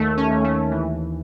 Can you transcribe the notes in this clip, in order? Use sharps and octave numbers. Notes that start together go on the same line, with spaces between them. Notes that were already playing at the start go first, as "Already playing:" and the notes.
Already playing: D#2 D#3 A3
C#4
D#2
A3
E3